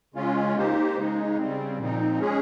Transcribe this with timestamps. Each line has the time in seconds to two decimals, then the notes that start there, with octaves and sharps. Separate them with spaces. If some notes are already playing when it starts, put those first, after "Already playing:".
0.14 C#3 G#3 C#4 F4
0.56 A#3 D#4 G4 C5
0.96 C#3 G#3 D#4
1.37 C#3 G3 C4
1.78 A#2 F3 C4 D#4
2.20 G#3 C#4 G#4